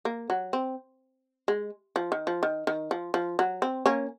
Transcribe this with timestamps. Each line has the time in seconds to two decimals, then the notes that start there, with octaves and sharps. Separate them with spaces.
0.05 A#3
0.30 F#3
0.53 C4
1.48 G#3
1.96 F3
2.12 D#3
2.27 F3
2.43 D#3
2.67 D#3
2.91 F3
3.14 F3
3.39 F#3
3.62 C4
3.86 A#3 C#4